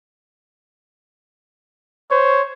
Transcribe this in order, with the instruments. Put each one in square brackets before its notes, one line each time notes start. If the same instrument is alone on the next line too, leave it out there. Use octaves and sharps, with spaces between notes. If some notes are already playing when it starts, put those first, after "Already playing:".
[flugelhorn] C5 [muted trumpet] C#5